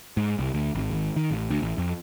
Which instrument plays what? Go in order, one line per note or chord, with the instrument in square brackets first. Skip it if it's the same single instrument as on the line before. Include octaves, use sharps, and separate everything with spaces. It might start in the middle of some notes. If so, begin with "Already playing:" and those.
[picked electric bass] G#2
C2
D2
G#1
G#1
D#3
A1
D2
A1
F2